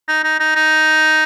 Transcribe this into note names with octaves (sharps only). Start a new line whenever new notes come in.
D#4
D#4
D#4
D#4